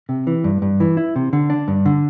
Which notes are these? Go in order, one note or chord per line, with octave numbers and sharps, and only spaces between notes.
C3
E3
G2
G2
E3
E4
C3
D3
D4
G2
D3